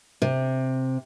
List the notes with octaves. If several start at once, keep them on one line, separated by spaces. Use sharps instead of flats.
C3